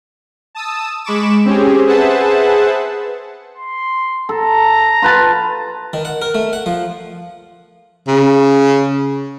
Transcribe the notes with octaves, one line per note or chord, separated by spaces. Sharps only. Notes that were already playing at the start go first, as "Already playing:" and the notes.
A5 D#6 E6
G#3 B5 C#6 D6 E7
C4 C#4 G4 G#4
G#4 B4 C5 E5 F#5 A5
C6
A4 A#5
F4 B4 A5
D#3
F#5
A#4
A3
F#5
F3
C#3